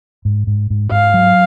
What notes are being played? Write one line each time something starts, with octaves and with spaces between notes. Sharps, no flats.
G#2
G#2
G#2
G#2 F5
F#3